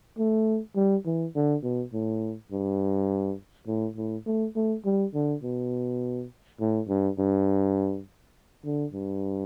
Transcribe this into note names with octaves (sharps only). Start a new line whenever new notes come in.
A3
G3
E3
D3
B2
A2
G2
A2
A2
A3
A3
G3
D3
B2
A2
G2
G2
D3
G2